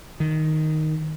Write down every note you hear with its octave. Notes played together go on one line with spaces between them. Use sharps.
D#3